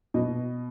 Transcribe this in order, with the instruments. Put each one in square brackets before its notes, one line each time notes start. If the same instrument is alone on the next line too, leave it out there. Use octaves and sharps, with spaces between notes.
[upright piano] B2 D#5